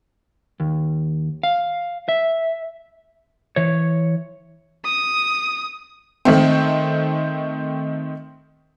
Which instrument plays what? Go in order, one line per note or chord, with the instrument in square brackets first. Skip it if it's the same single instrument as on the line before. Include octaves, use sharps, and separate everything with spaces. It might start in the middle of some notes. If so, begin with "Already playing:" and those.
[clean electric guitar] D#2
F5
E5
[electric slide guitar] E3 C#5
[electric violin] D#6
[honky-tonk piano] D#3 A3 C4